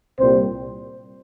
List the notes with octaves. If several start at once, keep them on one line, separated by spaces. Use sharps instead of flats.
C2 A#2 G3 C4 C5